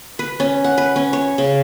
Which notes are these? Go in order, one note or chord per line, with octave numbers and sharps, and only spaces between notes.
B4
C#4
F#5
B4
C#4
C#5
C#3